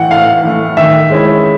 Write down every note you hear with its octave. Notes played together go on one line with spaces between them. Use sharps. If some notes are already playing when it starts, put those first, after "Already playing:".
Already playing: A2 E3 A3 F#5 G5
A2 F5
E3 A3
D#3 E5
G#3 C#4 E4